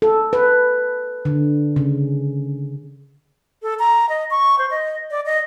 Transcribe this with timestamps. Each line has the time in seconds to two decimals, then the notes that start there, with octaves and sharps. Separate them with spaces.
0.02 A4
0.33 B4
1.25 D3
1.76 C#3
3.62 A4
3.79 A#5
4.09 D#5
4.31 C#6
4.59 C5
4.71 D#5
5.11 D5
5.26 D#5